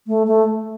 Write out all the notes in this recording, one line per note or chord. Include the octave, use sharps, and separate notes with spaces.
A3
A3